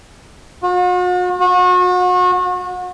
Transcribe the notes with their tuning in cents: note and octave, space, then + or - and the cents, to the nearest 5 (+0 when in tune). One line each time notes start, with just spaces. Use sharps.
F#4 -45
F#4 -35